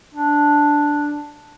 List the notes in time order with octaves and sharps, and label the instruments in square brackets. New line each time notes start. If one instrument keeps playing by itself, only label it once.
[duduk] D4